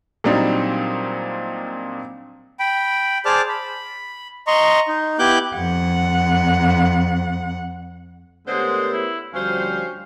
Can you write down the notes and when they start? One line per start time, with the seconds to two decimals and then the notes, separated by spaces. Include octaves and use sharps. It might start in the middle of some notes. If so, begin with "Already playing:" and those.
0.24 A#2 F#3 G3 C4 D4 D#4
2.59 G5 B5
3.25 G#4 C5 D5 A5 D6 F6
3.49 B5
4.47 D#5 A#5 C6 C#6
4.88 D#4
5.19 B3 E4 G4 D6 F#6 G6
5.57 F2 F#5
8.47 D3 G#3 A3 B3 G4 A#4 C5 C#5
8.92 E4
9.34 D2 F3 G3 C#4 F#4 C5 F5